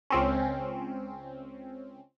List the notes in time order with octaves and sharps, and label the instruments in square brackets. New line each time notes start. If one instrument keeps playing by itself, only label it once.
[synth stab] C#2 C4 C#4